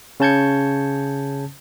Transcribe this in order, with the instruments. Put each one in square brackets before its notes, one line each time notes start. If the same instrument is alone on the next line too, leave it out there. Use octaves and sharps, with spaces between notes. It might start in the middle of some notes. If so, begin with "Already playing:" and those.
[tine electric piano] C#3 C#4 A5 G6 G#6 C#7